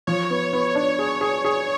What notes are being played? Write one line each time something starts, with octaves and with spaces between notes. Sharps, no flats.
F3 C#5
B3
B3
D4
G#4
G#4
G#4